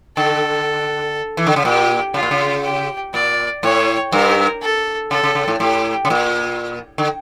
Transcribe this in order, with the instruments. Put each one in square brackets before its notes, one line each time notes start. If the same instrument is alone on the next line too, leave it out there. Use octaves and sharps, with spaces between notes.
[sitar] D3 [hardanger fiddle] A4
[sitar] E3
D3
C#3
[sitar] A#2 [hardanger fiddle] G4
[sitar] C#3 [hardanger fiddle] F4
[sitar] A#2
C#3
[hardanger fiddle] G4
[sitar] A#2 [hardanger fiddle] D5
[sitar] A2 [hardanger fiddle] C#5
[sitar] G2 [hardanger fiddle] A#4
[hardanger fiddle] A4
[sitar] C#3 [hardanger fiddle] A4
[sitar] C#3
C#3
A2
[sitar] A2 [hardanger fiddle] G4
[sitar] C#3
A#2
D3